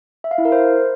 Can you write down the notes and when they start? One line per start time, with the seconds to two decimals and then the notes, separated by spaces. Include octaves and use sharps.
0.24 E5
0.31 F5
0.38 E4
0.45 A#4
0.52 C5